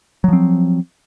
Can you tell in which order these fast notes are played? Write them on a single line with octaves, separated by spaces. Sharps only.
F#3 F3 C4